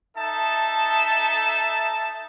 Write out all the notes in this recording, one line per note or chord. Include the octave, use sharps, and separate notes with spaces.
D#4 A4 E5 A5